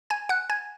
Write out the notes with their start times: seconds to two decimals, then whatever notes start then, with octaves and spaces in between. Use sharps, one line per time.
0.10 G#5 G#6
0.29 F#5 F#6
0.50 G#5 G#6